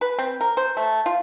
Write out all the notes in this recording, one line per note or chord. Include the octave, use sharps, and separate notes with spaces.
B4
C4
A#4
C5
A3
F4